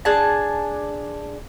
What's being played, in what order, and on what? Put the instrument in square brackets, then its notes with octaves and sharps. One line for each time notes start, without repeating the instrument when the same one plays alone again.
[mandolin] D4 G#4 A5